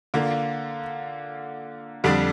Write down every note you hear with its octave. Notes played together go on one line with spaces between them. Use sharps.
D3 A#3 F4
F2 D3 G3 D4